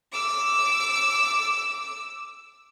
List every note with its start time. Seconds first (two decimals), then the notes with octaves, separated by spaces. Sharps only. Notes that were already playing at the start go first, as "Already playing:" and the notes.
0.12 D6 E6